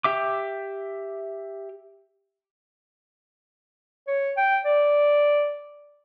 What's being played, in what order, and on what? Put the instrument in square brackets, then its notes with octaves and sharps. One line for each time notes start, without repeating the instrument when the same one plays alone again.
[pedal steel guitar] G4 E5 D6
[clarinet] C#5
G5
D5